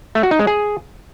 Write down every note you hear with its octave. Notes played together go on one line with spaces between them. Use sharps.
A3
F#4
D#4
G#3
G#4